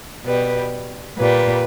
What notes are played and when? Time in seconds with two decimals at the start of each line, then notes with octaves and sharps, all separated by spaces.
0.24 B2 G3 B4
1.18 A#2 G3 B4